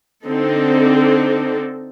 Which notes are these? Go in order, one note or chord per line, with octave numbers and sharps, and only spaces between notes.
D3 C4 D#4 A4